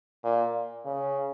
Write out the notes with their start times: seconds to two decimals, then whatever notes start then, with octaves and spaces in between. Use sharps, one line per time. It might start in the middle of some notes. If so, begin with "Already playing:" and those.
0.24 A#2
0.85 C#3